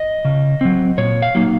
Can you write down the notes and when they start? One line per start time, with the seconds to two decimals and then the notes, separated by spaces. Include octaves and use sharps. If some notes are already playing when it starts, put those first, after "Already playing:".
Already playing: D#5
0.25 C#3
0.61 F#3 C4
0.98 A#2 C#5
1.22 F5
1.35 F#3 A#3 D#4